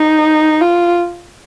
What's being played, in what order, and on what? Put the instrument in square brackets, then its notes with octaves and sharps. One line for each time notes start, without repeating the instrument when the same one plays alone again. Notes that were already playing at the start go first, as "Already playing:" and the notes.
Already playing: [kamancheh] D#4
F4